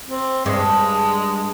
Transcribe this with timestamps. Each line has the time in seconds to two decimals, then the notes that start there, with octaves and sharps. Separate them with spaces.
0.07 C4
0.46 G2 G#3